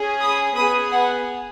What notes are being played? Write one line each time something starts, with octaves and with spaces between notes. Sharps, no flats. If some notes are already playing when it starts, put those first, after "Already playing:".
Already playing: C#4 G#4
B5 D#6
B3 G#4 B5 D#6
F#5 B5